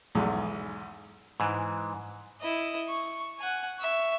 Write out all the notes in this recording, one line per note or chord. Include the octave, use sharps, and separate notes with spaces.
B1 E2 G#2
G#2 E3
E4 D#5
C#6
F#5 G#5
E5 C#6